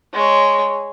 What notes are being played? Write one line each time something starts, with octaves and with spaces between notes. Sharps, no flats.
G#3 C#5